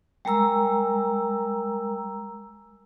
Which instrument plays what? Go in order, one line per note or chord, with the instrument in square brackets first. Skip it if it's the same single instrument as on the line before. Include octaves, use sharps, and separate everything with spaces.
[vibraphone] G3 G#3 A#4 A#5 E6